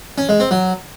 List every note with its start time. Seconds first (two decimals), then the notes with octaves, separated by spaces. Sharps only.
0.18 C#4
0.29 G#3
0.40 C4
0.51 F#3